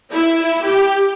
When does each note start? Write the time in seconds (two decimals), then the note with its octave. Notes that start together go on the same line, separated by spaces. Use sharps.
0.11 E4
0.63 G4